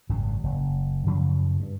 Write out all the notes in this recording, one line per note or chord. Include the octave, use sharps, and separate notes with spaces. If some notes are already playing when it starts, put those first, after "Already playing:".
G#1 F#2 C#3
F#1
F#2 C#3 F3 F#3
G2